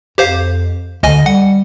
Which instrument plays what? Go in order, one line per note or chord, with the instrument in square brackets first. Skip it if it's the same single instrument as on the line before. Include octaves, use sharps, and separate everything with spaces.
[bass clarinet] F2 [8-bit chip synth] G4 C5 F5
[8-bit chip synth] D2 D#5 G#5 [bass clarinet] D3
[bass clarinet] G3 [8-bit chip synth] F#5